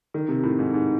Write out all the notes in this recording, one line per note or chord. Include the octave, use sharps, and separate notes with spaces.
D#3
C3
A2
G#2
G#2